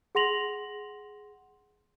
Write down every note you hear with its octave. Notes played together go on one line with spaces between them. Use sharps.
G#4 F#5 C6 A#6 F7 F#7